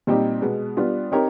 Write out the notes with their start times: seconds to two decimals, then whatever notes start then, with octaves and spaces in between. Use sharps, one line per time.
0.07 A#2 G3 C4 D#4 G4
0.42 B2 G#3 B3
0.77 G3 B3 D4 F4
1.12 C4 D#4 G4 A#4 C#5